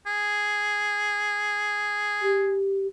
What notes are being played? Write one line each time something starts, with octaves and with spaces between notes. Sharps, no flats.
G#4
G4